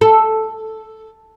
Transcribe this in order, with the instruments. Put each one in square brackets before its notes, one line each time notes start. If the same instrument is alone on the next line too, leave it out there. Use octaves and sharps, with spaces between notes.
[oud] A4